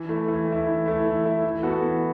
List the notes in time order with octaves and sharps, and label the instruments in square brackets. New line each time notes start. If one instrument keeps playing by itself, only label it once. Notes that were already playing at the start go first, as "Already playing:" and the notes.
Already playing: [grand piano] E3
A3 E4
E3
A3 E4
E3
A3 E4
E3
A3 E4
E3
B3 F#4 A4
E3